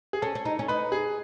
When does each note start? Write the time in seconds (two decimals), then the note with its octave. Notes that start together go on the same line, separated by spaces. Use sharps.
0.13 G#4
0.22 C#4 A4
0.35 C#4
0.45 D#4
0.59 C#4
0.68 D#4 B4
0.92 G#4